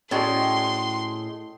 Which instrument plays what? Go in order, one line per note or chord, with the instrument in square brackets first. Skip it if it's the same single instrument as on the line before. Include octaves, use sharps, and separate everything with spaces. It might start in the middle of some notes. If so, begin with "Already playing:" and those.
[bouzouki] A2 G#3 [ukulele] C#4 F#4 D5 [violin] C6